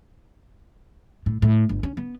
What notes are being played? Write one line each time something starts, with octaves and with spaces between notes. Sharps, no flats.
A2
A2
G1
C#4
B3